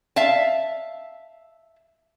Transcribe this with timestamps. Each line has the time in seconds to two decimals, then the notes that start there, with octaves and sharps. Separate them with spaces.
0.16 E5 F5 A5